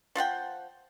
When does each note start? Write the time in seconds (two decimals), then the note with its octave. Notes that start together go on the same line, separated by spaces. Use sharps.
0.15 F3 F4 F#5 G5